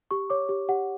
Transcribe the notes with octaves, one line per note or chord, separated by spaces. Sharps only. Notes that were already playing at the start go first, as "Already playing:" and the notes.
G4 C#6
C#5 D6
G4
G4 F#5